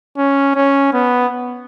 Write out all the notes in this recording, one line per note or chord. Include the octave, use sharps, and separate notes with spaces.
C#4
C#4
B3